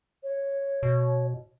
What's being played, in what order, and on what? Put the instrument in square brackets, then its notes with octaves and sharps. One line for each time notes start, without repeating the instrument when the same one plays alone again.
[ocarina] C#5
[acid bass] B2